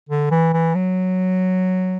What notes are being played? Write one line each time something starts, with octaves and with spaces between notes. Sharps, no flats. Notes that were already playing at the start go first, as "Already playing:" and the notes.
D3
E3
E3
F#3